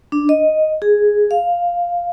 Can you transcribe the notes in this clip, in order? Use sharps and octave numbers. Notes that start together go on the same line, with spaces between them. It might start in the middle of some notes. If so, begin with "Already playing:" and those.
D4
D#5
G#4
F5